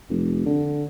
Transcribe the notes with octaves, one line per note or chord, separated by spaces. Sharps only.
F1
D3